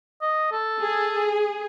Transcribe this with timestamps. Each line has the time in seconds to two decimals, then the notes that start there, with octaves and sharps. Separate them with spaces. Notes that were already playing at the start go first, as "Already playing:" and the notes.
0.21 D#5
0.52 A4
0.81 G#4